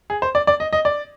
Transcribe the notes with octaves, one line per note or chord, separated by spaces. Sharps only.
G#4
C5
D5
D5
D#5
D#5
D5